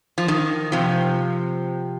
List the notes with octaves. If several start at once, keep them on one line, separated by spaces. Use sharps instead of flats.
F3
D#3
C3 F3